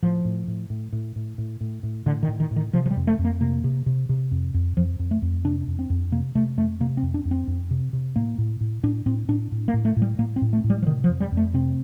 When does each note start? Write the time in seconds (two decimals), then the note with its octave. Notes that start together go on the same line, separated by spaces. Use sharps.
0.02 A2 F3
0.25 A2
0.48 A2
0.70 A2
0.92 A2
1.16 A2
1.38 A2
1.61 A2
1.83 A2
2.06 A2 D3
2.23 D#3
2.28 A2
2.40 D#3
2.51 A2
2.56 D#3
2.73 C3 F3
2.86 F3
2.91 G3
2.96 F2
3.07 A3
3.19 F2
3.25 A#3
3.41 C3 A#3
3.64 C3
3.86 C3
4.09 C3
4.31 F2
4.54 F2
4.77 F2 F3
4.99 F2
5.11 A3
5.22 F2
5.44 C3 D4
5.68 F2
5.79 C4
5.90 F2
6.12 C3 A#3
6.35 C3 A3
6.57 F2 A3
6.80 C3 A#3
6.97 C4
7.02 F2
7.14 D4
7.25 F2
7.31 C4
7.48 F2
7.71 C3
7.93 C3
8.16 A2 A#3
8.38 A2
8.61 A2
8.83 A2 D4
9.06 A2 C4
9.28 A2 D4
9.52 A2
9.68 A#3
9.74 A2
9.85 A3
9.96 A2
10.02 G3
10.18 A2 A#3
10.36 C4
10.42 A2
10.53 A3
10.64 A2
10.70 G3
10.82 F3
10.86 C3 D#3
11.04 F3
11.09 F2
11.20 G3
11.32 F2
11.37 A3
11.54 C3 C4